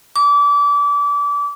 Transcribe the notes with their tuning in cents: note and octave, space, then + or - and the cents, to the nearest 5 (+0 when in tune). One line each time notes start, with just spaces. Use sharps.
D6 -30